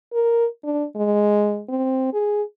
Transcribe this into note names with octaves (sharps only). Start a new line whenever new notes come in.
A#4
D4
G#3
C4
G#4